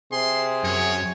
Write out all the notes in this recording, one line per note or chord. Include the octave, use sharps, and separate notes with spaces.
C3 G#4 C6
F#2 C#5